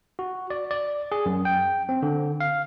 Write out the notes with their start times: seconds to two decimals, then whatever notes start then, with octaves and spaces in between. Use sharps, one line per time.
0.19 F#4
0.50 D5
0.71 D5
1.12 G#4
1.26 F#2
1.45 G5
1.89 C4
2.03 D3
2.40 F5